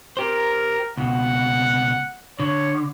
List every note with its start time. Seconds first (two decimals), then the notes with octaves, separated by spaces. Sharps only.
0.17 G4 A#4 C5
0.97 C#2 B2 F#5
2.39 D3 C#5